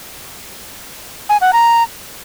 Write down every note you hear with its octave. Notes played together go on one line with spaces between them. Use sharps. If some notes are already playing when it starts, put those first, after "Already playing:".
G#5
F#5
A#5